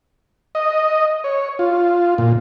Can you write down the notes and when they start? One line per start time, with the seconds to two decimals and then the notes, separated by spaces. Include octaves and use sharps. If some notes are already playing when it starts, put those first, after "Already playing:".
0.55 D#5
1.24 C#5
1.59 F4
2.18 A#2